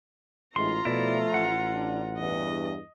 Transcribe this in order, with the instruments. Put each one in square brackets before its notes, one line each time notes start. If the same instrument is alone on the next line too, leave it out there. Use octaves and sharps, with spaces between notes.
[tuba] A1 [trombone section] G#2 G#3 E4 [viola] F4 A#5 [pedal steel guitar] C6
[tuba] B2 [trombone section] F3 A3 [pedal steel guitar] E4 D5
[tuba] A1 [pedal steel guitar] F#5
[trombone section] D4
[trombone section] E2 G2 [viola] D#5